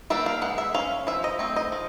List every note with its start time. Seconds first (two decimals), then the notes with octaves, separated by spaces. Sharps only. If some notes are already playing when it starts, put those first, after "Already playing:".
0.10 G3 A#3 D4 E5
0.26 F5
0.42 G#3 F#5
0.58 E5
0.74 C#4 F5
1.07 F3 E5
1.24 D#5
1.39 A3 C4
1.56 D#5
1.72 F3